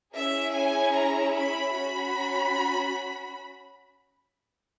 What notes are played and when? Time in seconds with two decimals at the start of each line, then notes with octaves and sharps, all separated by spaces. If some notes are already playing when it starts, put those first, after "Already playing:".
0.14 C#4 E4 G#4 E5
0.53 G#5
0.93 A#5
1.33 B5
1.72 C#4 F#4 B5